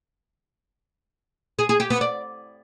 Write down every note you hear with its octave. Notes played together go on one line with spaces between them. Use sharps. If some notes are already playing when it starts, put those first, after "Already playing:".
G#4
G#4
G4
B3
D5